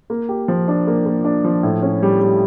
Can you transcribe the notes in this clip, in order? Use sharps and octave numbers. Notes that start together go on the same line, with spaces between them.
A#3
G4
F3
D4
A#3
A#3
D4
F3
A2
C#4
G3
G3